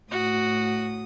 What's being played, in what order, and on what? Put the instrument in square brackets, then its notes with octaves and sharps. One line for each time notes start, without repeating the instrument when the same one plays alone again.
[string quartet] A2 D#6 [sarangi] F#4